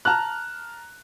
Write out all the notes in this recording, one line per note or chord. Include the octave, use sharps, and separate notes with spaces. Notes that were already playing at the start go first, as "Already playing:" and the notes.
A5 A#5 F6 F#6